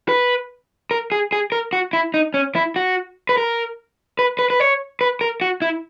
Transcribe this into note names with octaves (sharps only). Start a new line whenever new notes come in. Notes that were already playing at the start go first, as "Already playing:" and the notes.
B4
A#4
G#4
G#4
A#4
F#4
E4
D#4
C#4
E4
F#4
B4
A#4
B4
B4
B4
C#5
B4
A#4
F#4
E4